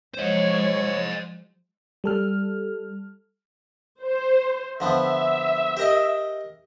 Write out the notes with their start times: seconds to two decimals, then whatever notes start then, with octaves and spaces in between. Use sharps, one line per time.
0.14 F3 F#3 G#3 C5 C#5 D#5
2.04 G3 A4 F6
4.01 C5
4.80 D3 F3 B3 E5
5.77 G4 A#4 D#5